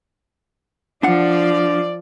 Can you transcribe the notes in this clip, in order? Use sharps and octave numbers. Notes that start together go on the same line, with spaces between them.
F3 D4 D5 F#5